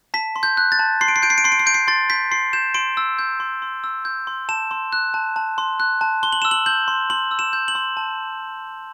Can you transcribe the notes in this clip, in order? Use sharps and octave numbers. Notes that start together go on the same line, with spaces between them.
A5 B6
C6
G6
F#6
A6
A5
C6 C7
D7
C7
G6 D7
C7
D7
C6 C7
D7
C7
G6 D7
C7
C6 A6
G6 B6
C6 C7
G6 E7
C6 D7
E6
G6
C6
C6
E6
G6
C6
A5 E7
C6
F#6
A5
A5
C6
F#6
A5
C6 G7
F#7
E6 E7
F#7
G6 F#7
C6
C6 F#7
E6
E7
G6
F#7
C6
A5